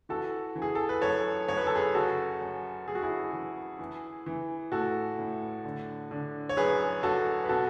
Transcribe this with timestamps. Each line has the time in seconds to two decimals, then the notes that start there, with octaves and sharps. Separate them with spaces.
0.09 E3 F#4 A4
0.56 E3
0.62 G#4
0.75 A4
0.89 B4
1.01 F#2 A4 C#5
1.48 F#2 C#5
1.57 B4
1.67 A4
1.75 G#4 B4
1.94 C#3 F#4 A4
2.41 F#2
2.87 F#2 G#4
2.95 F#4
3.02 E4 G#4
3.33 E3
3.79 E3
4.26 E3
4.72 A2 F#4 A4
5.19 A2
5.64 D3
6.11 D3
6.49 C#5
6.57 F#2 G#4 B4
7.03 F#2 F#4 A4
7.44 B4
7.49 B2 F#4 A4